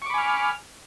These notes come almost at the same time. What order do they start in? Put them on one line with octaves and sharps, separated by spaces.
C#6 D6 B5 G#5 F6